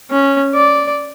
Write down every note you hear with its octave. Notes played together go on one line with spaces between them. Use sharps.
C#4
D5